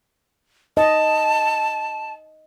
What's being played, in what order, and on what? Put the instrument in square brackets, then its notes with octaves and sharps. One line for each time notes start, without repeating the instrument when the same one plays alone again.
[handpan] D#5 [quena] A5